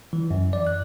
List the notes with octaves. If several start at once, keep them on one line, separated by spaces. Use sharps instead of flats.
E3
F#2
D5
F#6